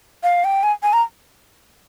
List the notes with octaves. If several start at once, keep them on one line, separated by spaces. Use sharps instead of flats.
F5
G5
G#5
G#5
A#5